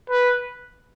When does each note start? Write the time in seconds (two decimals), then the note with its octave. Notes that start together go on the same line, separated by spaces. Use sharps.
0.10 B4